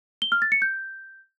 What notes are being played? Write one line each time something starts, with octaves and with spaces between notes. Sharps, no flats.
G7
F6
A6
C#7
G6